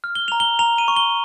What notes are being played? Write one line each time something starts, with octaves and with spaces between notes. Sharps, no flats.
F6
G7
A#5 F7
G7
A#5 F7
D#7
C#6
G7